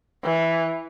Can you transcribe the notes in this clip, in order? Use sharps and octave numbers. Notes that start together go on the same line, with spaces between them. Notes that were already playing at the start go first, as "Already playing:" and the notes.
E3